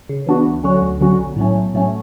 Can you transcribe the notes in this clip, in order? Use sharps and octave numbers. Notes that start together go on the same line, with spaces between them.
C#3
E3 B3 D4 F#4
D2
D3 F#3 C#4 F#4
D2
D3 F#3 C#4 F#4
B1
A2 F#3 A3 C#4
B1
A2 F#3 A3 C#4